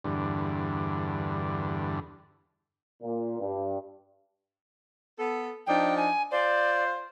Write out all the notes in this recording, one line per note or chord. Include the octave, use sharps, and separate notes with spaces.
E2 G2 D3
A#2
G2
B3 A4
F3 D4 D#4 G5
G#5
F4 C5 D5